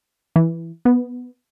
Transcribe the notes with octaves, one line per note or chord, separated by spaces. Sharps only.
E3
B3